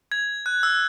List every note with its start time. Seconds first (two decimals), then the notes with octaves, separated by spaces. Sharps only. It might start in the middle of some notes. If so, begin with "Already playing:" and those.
0.12 G#6
0.46 F#6
0.63 E6